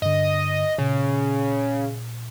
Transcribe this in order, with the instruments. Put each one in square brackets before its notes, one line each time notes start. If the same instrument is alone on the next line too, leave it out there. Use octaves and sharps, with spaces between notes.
[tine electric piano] G2 D3 [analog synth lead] D#5
[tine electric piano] A#2 [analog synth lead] C#3